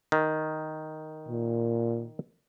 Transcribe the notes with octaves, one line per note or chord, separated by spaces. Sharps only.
D#3
A#2